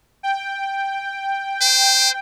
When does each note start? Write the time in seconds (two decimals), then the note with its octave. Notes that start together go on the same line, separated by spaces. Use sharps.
0.23 G5
1.61 C5